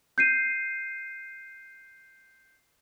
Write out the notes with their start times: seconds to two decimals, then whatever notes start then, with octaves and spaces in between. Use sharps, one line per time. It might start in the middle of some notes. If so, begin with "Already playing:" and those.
0.18 G6 C7 D#7